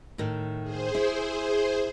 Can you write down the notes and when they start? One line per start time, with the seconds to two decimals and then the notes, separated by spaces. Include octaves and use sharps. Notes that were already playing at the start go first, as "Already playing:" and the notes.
0.18 A2 D#3
0.62 G#4 C5
0.95 E4